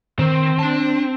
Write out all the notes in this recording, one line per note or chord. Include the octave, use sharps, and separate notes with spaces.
D#3 C4
D4 A5